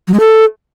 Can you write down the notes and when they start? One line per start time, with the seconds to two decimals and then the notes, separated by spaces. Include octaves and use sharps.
0.08 F#3
0.14 G#3
0.20 A4